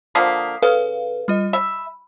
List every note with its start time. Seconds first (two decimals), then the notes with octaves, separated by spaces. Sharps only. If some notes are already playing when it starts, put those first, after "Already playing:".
0.15 D3 F3 A#3 D#6 B6 C7
0.62 C#3 A4 B4 F5
1.28 G3 F4 D#5
1.53 E5 B5